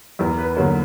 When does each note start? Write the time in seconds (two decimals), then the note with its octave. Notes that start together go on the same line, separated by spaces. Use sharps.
0.19 E2 A#4
0.38 B4
0.56 D3 F#3 A#3 C#5